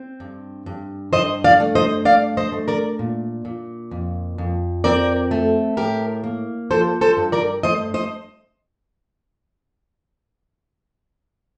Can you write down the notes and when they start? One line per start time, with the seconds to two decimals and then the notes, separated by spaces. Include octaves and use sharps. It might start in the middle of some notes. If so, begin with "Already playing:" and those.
Already playing: C4
0.20 G2
0.66 G2
1.13 G2 C5 D#5
1.44 D5 F5
1.60 A3
1.75 C5 D#5
2.05 G2 D5 F5
2.37 C5 D#5
2.52 A3
2.68 A#4 D5
2.99 A#2
3.45 A#2
3.91 F2
4.38 F2
4.84 C4 A#4 D5
5.31 A3
5.77 A2 G4 A#4
6.24 A#3
6.70 F3 A4 C5
7.01 A4 C5
7.17 G2
7.32 A#4 D5
7.63 A3 C5 D#5
7.94 C5 D#5